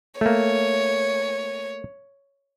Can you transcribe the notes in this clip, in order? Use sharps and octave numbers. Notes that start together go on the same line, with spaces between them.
A3 A#3 C#5